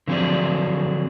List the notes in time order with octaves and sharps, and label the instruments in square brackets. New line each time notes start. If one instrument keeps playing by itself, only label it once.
[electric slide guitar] D3 F3 F#3 C4 G#4 D5